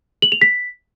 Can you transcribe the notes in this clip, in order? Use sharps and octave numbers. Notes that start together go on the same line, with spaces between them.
F#7
F7
B6